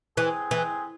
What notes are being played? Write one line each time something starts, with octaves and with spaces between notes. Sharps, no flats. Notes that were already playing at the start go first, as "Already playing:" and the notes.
E3 G#3 C4 G#4
E3